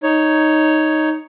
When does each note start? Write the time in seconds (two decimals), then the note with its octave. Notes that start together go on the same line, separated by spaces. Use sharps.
0.03 D#4 C#5